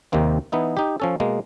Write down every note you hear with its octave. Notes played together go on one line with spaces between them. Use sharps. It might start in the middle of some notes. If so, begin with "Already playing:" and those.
D#2 C3 D#3 A#3 C4
E3 B3 D#4 E4
D#4 G4
F3 C#4 A4
B2 G#3 A#3